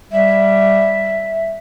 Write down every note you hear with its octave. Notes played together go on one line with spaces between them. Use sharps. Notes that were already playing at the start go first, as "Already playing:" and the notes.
G3 E5